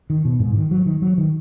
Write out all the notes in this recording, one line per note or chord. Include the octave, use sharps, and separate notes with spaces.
D#3
B2
G#2
D#3
F#3
D#3
F#3
D#3